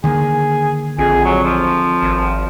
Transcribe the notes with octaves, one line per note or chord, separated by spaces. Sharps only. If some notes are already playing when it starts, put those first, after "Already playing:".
D3 D#3 A#3 G#4
A#1 F2 G#4
F#3
F3
G#1